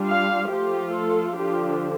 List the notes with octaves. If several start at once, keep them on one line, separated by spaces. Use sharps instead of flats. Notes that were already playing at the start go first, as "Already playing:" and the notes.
Already playing: G3 D4 F4
F5
F3 A3 F4 G4
A4
D3 F3 D4 F4 G4